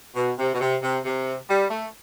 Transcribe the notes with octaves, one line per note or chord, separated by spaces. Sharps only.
B2
C3
B2
C3
C3
C3
G3
A3